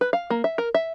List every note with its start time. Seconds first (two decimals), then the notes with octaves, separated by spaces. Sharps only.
0.01 B4
0.13 F5
0.30 A#3
0.44 E5
0.58 A#4
0.74 E5